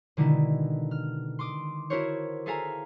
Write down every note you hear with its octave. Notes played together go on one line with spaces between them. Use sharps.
B2 D3 D#3 G#3 D#4 E4
F6
C6 D6 D#6
E4 F#4 A#4 C5 C#5
G#4 A4 E5 F5 G#5 A#5